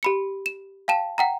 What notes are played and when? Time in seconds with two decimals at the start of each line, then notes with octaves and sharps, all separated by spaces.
0.03 G4 B5 C#7
0.46 E7
0.88 F5 G5 A5 E7
1.18 F#5 G5 A#5